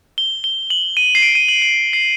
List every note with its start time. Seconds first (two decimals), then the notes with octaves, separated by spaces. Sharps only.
0.18 G7
0.44 G7
0.70 F#7
0.97 D#7
1.15 C7
1.22 D7
1.35 D#7
1.48 F#7
1.62 F#7
1.93 C7